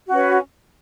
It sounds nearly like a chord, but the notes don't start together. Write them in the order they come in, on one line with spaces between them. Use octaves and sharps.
F#4 C#4 B4